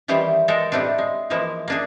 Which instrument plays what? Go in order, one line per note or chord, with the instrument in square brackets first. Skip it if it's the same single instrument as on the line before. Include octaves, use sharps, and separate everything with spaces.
[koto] D#3 E3 G3 E4 G4 C5
G#3 A4 A#4 G5
A2 G3 A3 C4 D4
G#3
E3 F3 G#3 A#3 E4
A#3 D4 G#4